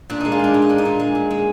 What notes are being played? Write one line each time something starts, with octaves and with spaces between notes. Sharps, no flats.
A#2 D4
G#3 D#4
F4
G#3 D4
A#2 F4
D#4
A#2 D4
D#4
A#2
G#3
A#2
G#3